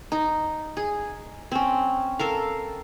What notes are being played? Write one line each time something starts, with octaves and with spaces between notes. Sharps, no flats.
D#4
G#4
C4 C#4
A4 A#4 F5